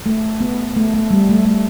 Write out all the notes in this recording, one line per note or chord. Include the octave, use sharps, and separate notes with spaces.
A3
B3
A3
A3
G3
A3
A3